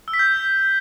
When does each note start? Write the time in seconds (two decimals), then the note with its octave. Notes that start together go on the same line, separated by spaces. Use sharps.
0.08 E6
0.14 B6
0.19 G6